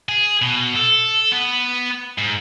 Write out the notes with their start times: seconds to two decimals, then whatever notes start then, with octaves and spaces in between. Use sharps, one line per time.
0.09 G#4
0.42 B2
0.76 A4
1.32 B3
2.18 G#2